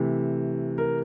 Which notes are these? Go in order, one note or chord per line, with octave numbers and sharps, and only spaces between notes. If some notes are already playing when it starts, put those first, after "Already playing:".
Already playing: C3 E3 A3
A#4